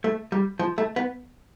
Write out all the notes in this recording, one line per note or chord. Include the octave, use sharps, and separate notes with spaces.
A3
G3
F3
A3
B3